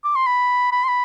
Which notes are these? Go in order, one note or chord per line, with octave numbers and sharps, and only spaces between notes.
D6
C6
B5
B5
C6
B5